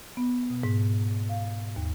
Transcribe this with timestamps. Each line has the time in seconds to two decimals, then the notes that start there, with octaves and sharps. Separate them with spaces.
0.17 B3
0.50 B2
0.63 G#2
1.29 F5
1.76 D#2